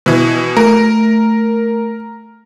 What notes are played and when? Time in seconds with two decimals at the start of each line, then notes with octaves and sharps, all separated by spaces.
0.06 B2 E3
0.57 A3 A#4